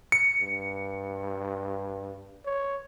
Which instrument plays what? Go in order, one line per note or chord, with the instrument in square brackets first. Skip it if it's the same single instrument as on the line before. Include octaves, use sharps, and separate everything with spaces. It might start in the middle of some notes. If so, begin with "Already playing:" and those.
[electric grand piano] C#7
[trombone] G2
C#5